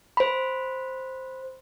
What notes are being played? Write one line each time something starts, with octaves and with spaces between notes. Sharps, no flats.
C5 B5